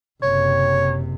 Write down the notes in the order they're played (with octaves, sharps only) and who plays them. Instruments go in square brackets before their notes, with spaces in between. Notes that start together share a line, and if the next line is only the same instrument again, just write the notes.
[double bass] F#1 C3 [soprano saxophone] C#5